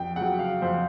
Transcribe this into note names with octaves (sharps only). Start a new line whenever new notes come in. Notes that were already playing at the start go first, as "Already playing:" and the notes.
Already playing: F2 G5
C#3 F#3 F#5
F5
F2 C5